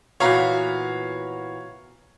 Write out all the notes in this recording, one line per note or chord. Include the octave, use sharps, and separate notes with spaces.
A#2 E3 B3 F#4 C#5 F5 A#5